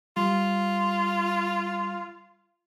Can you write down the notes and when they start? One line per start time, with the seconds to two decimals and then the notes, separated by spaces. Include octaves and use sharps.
0.17 G3 F4